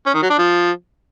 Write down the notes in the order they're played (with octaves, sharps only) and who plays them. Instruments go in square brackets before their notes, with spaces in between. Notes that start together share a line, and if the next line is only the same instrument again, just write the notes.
[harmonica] C#4
D#3
F#3
D4
F3